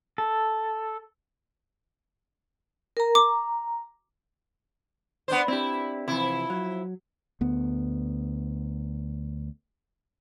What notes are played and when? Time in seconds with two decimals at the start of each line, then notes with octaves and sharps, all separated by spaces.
0.18 A4
2.97 A#4 A#5
3.15 A#5 D6
5.28 B3 D4 C5
5.48 C4 D4 E4 G4
6.08 C3 E3 F3 E4
6.50 F#3
7.41 D2 B3